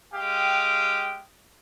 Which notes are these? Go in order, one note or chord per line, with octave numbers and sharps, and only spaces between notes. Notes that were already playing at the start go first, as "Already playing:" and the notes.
G#3 G4 F5 G5 D#6